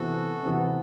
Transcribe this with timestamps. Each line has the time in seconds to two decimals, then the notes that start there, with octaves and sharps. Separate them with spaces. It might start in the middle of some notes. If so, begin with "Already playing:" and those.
Already playing: C3 E3 B3 F#4 A4
0.43 C3 E3 B3